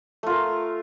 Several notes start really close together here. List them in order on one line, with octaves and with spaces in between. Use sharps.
A3 F4 A#4